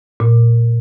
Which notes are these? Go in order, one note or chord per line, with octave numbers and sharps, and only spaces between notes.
A#2